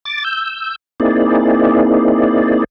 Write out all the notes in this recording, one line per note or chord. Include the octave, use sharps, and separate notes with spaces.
D6 A6
E6 G6
A#3 C4 D#4 E4 G#4 D5